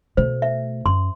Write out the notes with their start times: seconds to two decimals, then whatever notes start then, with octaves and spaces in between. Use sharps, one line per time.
0.17 B2 A3 C5
0.42 E5
0.86 F#2 C6